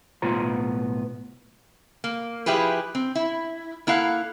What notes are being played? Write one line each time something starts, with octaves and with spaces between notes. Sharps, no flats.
B1 A2 B3 F4 C5 A#5
A#3
F3 E4 G4 G#4 B4
C4
E4
A#3 E4 A4 F5 F#5